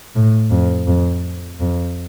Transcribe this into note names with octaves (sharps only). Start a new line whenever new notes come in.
A2
F2
F2
F2